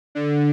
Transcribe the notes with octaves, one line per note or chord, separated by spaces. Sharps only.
D3